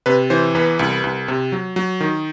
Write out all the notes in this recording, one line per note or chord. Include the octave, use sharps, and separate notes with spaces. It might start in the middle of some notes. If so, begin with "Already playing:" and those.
C3 B4
E3 C5
E2 B4
C2
C2
C3
F#3
F#3
D#3